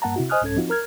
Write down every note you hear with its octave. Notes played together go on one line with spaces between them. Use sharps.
G2 A#3 F#5 A5 A#5
C3 E4 F#4
C5 D#5 G#5 D#6 F6 F#6
C2 G#2 C#4 A4 G#6
F3 C4 D#4 F4 F#4
A#4 F6 G#6